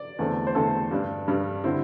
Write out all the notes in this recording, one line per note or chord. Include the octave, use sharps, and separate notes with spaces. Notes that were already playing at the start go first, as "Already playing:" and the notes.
Already playing: D5
E2 D3 A3 C4
C5
E2 D3 A3 C4 A4
G2 G3 D4
G2 G3 D4
D3 C4 E4